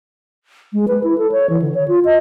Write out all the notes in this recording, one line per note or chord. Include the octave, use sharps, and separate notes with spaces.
G#3
B4
E4
A4
C#5
E3
D3
C#5
F4
D#5